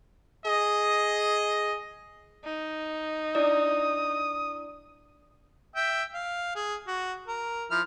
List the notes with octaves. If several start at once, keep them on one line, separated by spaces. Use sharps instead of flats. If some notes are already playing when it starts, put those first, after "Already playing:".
G#4 D#5
D#4
D4 E4 D5 D#6
E5 G5
F5
G#4
F#4
A#4
F3 E4 F6